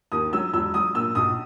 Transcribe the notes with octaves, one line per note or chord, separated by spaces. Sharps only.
D#2 D#6
F#3 E6
E1 E6
F#3 D#6
A#2 E6
B1 D#6